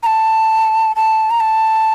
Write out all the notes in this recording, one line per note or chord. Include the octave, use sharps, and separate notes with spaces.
A#5
A5
A5
A#5
A5